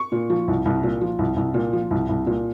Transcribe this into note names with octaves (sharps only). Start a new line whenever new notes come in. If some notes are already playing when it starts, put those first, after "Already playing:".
Already playing: C#6
A#2
F3
C2
C2
A#2
F3
C2
C2
A#2
F3
C2
C2
A#2